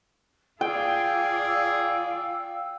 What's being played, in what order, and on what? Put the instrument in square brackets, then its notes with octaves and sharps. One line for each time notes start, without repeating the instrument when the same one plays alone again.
[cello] F4 D5 [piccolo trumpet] G#4 [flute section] F5 E6 [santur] G5